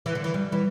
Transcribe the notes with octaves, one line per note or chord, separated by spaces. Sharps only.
E3
D3
E3
G3
E3